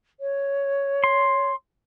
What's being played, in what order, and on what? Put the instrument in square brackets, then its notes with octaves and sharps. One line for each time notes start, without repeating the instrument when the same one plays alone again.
[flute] C#5
[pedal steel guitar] C6